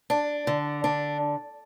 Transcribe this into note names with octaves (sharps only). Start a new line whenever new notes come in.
D4
D3
D4